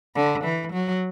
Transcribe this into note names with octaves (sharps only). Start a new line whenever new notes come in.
D3
E3
F#3